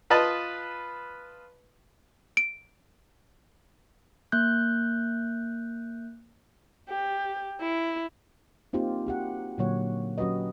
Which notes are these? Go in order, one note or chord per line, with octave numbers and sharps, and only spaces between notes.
F4 B4 D#5 A5 B5
D7
A#3 F#6 G6
G4
E4
A#3 C4 D#4 F4 G4
F#4 G4 F#5
A#2 D3 F#3 A#3 C#5 F#5
F#3 C#4 F#4 G4 B4 D#5